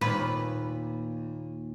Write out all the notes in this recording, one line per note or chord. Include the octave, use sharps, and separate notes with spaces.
D#2 A#2 B4